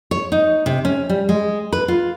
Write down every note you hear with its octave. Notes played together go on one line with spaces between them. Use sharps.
C#5
D#4
C3
C#4
G3
G#3
B4
F4